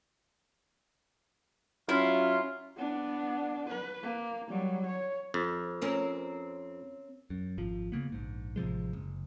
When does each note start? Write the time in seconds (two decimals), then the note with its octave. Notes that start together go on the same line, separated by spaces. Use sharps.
1.89 F#3 C#4 E4 F4
2.77 B3 D4
3.70 B4
4.03 A#3
4.48 F#3 G3
4.87 C#5
5.34 F2
5.82 C4 C#4 A#4
7.30 F#2
7.58 G#1 F3
7.92 C#3 A#3 B3
8.12 A#1 G#2
8.56 A1 C3 F3 G#3
8.93 F#1